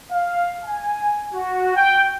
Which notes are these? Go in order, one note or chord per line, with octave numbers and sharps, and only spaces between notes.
F5
G#5
F#4
G5